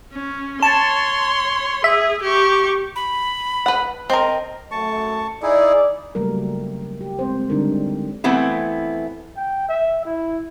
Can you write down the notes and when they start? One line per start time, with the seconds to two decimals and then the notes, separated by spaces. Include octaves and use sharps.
0.12 C#4
0.63 C#5 A5 C6
1.84 G#4 E5
2.22 G4 C#6
2.96 B5
3.66 B4 F#5
4.10 C4 A#4 D#5
4.71 F#2 A3 A5 C#6
5.43 D#4 E4 G#4 D5
6.15 C#3 F#3 G3 A3 A#3 A#4
7.01 G4
7.19 G#3 C4 C5
7.49 D3 G3 G#3 D4 D#4 A#4
8.24 E3 A3 B3 C4 E4
9.36 G5
9.69 E5
10.05 E4